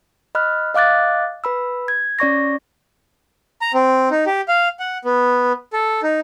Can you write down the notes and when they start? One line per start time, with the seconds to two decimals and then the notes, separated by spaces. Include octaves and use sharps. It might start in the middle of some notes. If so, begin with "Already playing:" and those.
0.35 D#5 B5 F6 F#6
0.74 D#5 F5 D6 F#6 A6
1.44 B4 B5 E6
1.88 G#6
2.19 C#4 D5 C#6 A#6
3.62 A#5
3.74 C4
4.11 D#4
4.27 G4
4.48 F5
4.79 F#5
5.05 B3
5.73 A4
6.03 D#4